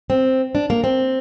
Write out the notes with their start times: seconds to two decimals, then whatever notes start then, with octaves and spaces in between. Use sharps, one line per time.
0.10 C4
0.55 D4
0.70 A#3
0.84 C4